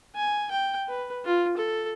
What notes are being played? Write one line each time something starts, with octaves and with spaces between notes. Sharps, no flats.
G#5
G5
B4
F4
A4